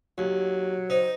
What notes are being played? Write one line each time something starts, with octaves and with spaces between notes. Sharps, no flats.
D#2 F#3
D#4 C5